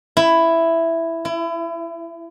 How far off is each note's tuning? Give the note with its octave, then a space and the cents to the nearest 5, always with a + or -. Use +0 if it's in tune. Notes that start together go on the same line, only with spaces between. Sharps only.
E4 +5
E4 +30